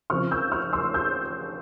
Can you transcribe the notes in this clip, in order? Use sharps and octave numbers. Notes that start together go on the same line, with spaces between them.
C#3 F3 C4 F4 C#6 F6
E6 G6
C#6 F6
C6 E6
E6 G6